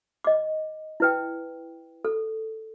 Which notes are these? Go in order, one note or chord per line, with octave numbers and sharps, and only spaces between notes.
D#5 D6
E4 B4 G5
A4